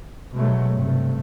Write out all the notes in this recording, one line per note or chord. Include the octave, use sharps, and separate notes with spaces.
B2 F#3 G#3 A3
G2 C3 A3